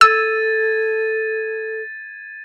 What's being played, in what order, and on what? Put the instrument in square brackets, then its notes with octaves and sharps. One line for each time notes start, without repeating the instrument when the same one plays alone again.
[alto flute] A4 [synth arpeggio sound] E6 [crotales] G#6 A6 D#7